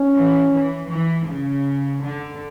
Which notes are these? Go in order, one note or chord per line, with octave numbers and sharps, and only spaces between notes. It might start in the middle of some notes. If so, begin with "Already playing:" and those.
Already playing: C#4
E3
E3
E3
C#3
D3